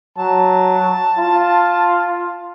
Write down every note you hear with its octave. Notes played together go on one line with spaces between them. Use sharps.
F#3 A5
F4